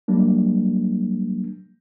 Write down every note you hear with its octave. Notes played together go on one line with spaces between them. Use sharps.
F#3 G3 A#3 D4